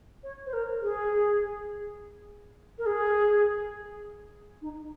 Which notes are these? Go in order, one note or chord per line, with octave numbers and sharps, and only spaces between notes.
C#5
C5
A#4
G#4
A#4
G#4
D#4